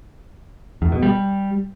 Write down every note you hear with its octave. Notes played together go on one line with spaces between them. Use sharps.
E2
B2
G3